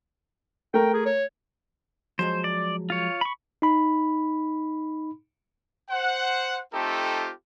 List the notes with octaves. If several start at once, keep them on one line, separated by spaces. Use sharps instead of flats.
A3 A#4 G5
G#4
C#5
F3 F#3 G#3 C5
D5
F4 C#5
B5 C#6
D#4 B5
C5 F#5
A3 C4 D#4 F4 G4 A4